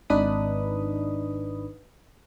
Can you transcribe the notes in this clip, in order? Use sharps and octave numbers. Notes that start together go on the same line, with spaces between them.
G#1 D4 D#4 B4 B5 D#6